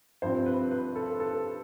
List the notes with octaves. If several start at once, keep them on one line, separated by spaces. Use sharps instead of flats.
G2 F3 C4 C5
B4
B4
A4
A4